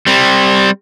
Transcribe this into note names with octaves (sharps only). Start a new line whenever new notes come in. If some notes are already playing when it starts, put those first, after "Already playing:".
G3 C4